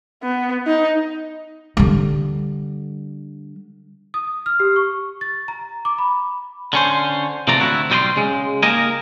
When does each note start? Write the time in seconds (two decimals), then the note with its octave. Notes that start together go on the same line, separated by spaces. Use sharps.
0.23 B3
0.67 D#4
1.77 D3 G3
4.14 D#6
4.46 F6
4.60 G4
4.76 C#6
5.21 A6
5.48 A#5
5.85 D6
5.98 B5
6.73 D3 C#4 C5
7.48 C3 F3 A3 F4 D5 A#5
7.60 D2 C4 E4 F#4
7.90 B1 G3 C5 D#5 G5 C6
8.17 C#3 G#3
8.63 A#3 D#4 G4 A#4 D#5 G#5